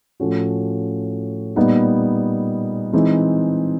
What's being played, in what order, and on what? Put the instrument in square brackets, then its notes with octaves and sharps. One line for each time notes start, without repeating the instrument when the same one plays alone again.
[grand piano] A2 F3 A3 C#4 F#4
A#2 G3 B3 D#4
E3 G#3 C4 D#4